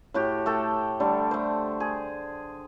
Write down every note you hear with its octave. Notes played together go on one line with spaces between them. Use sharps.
A2 F#4 G4
A3 A4 G5
D3 G3 A3
A3 C5
G#4